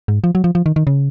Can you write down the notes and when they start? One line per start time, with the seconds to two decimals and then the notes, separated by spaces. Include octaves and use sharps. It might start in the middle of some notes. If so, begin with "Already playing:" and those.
0.08 G#2
0.24 F3
0.35 F#3
0.44 F3
0.55 F3
0.66 D#3
0.76 D#3
0.87 C#3